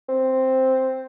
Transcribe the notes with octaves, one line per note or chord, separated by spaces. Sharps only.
C4